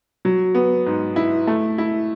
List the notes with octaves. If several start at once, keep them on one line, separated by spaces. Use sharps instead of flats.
F#3
B3
G#2
E4
A3
E4